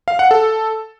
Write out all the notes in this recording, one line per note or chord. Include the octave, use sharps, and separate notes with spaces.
F5
F#5
A4